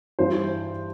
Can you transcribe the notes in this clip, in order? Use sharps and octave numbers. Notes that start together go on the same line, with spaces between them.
G2 E3 C5